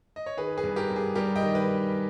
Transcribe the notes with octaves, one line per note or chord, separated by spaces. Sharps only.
D#5
C#5
D#3 G#4 B4
G#4 B4
G2
G4 A#4
G2
G#4
G3 G4 A#4
D#5 G5
D#3
B4 D#5